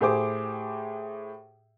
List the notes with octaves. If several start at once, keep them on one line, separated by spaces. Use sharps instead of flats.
A2 G4 G#4 C5 D6